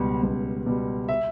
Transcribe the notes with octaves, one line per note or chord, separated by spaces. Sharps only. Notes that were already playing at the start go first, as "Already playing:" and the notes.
Already playing: C#2 B2 G3
C#2
B2 G3
E5